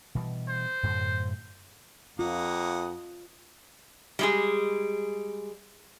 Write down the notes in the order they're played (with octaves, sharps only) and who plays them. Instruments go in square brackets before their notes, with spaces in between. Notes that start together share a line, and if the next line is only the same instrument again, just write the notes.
[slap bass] B2 E3 G3
[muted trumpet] C5
[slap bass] F#2 A2 D3
[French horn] F2 [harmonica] A#3 F#5 D#6 [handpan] F4
[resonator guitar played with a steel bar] G3 G#3 G#4